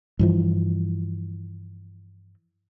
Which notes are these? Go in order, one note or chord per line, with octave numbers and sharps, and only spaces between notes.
G2 E3 F3